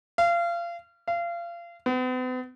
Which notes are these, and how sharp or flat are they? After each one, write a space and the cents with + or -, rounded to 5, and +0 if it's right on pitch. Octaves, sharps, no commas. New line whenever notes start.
F5 -30
F5 -30
B3 +45